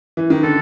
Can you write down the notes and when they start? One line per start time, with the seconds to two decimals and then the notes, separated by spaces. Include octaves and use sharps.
0.17 E3
0.30 D#3
0.43 D3 A4